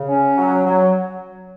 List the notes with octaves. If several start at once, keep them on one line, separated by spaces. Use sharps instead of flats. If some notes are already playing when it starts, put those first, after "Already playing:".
Already playing: C#3
C#4
F#3
F#3